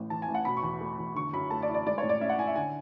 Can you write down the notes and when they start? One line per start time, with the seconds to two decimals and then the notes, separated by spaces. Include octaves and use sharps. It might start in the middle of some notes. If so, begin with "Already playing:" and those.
Already playing: A1 A2
0.10 E3 A5
0.22 G#5
0.28 A1
0.35 F#5
0.45 B2 B5
0.57 C#6
0.63 E2
0.81 A3
0.98 E2
1.15 D3 C#6
1.33 F#2 B5
1.50 A3 A5
1.62 D5
1.69 E4
1.74 D5
1.87 G#3 D5
1.98 C#5
2.03 A2
2.09 D5
2.21 C#4 E5
2.29 F#5
2.38 E4 G#5
2.47 E5
2.56 D3 G#5